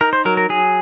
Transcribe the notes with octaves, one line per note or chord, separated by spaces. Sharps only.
D#4 A#4
C5
F#3 A#4
A#4
F#3 G#4